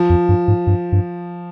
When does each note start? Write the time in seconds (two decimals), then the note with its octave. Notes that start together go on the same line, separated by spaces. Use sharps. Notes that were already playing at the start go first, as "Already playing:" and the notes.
Already playing: F3
0.10 F2
0.29 G2
0.48 G#2
0.67 G2
0.92 G2